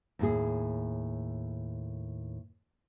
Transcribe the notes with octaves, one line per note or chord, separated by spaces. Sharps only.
D#2 A2 G#4